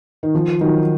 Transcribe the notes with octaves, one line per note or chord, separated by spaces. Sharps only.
D#3
F3
D#3 F#3